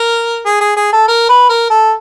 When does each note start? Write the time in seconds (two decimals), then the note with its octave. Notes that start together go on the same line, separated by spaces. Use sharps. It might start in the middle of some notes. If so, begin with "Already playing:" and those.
Already playing: A#4
0.46 G#4
0.60 G#4
0.76 G#4
0.93 A4
1.08 A#4
1.29 B4
1.49 A#4
1.70 A4